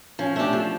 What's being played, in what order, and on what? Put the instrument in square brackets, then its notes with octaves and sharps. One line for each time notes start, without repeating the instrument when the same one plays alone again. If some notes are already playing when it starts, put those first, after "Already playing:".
[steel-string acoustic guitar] F3 [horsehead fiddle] C#4
[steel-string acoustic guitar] A3 D4 G4
F3